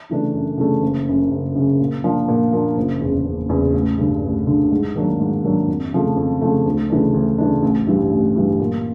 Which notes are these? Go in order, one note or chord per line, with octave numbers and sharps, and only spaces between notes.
C#3 E3 A3 D4
F#2
C#3 E3 A3 D4
F#1
F#2 C#3
F#1
F#2 C#3
A#2
F3 A#3 D4
A#2
F3 A#3 D4
F#1
E2 C#3
F#1
E2 C#3
A1
G2 D3
A1
G2 D3
G#2
D#3 F#3 A#3 D4
G#2
D#3 F#3 A#3 D4
F2
C#3 F3 A3
F2
C#3 F3 A3
D2
C#3 E3 A3 D4
D2
C#3 E3 A3 D4
A1
G2 E3 G3
A1
G2 E3 G3
A#2